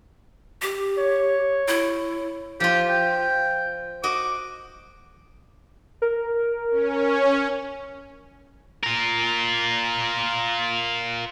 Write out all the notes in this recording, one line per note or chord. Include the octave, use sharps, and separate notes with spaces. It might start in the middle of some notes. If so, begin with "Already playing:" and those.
G4
C#5
E4
F3 F4 G4
G5
F#4 D#5 D6
A#4
C#4
F4 A#4